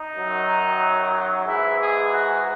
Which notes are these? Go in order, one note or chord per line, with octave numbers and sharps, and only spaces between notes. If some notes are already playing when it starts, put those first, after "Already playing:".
Already playing: D#4
F#2 D#3 F#3
G#2 E3 G#3 E4
G#4
F#4